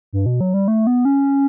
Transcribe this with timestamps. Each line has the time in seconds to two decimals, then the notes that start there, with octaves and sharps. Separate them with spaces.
0.13 G2
0.26 B2
0.41 F#3
0.54 G3
0.68 A3
0.87 B3
1.05 C#4